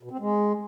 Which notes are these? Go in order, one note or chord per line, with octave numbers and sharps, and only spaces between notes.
B2
C4
G#3